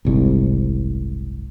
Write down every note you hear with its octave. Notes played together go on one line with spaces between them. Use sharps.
F#1 C2 G#2